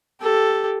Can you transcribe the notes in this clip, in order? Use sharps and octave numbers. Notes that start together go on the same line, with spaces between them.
G4 A4